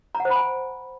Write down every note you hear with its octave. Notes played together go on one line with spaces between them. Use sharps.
A#5
F#5
C5
B5
G#5